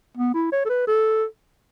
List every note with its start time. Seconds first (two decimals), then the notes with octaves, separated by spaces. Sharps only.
0.17 B3
0.34 E4
0.52 C#5
0.65 A4
0.69 B4
0.87 A4